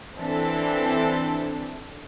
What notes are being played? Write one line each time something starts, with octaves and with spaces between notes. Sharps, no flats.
E3 C4 D4 A4